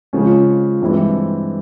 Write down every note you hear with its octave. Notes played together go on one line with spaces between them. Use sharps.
C#3 F3 G#3 C#4
G2 E3 G#3 C4 E4